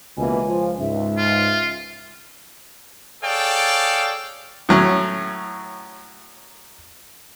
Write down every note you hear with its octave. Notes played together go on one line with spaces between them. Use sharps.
C#2 B2 E3 A#3 G#5
F3
C#2 G#2 E5
F4
G#4 A4 C#5 D5 F5 G5
A2 F#3 C#4